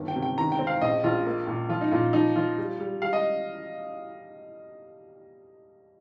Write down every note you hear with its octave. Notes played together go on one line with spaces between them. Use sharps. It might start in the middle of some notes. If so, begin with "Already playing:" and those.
Already playing: G1 D#3
G5
C3
G5
D#3 A#5
G5
C4
F5
A#1 D#5
A#1 F4
A#3
A#2
F3 F4
D#4
A#2 F4
F3 D#4
F3 F4
G3
G3
G3 F5
D#5